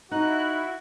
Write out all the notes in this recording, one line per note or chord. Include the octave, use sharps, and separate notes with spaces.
D#4 E4 F#4 F#6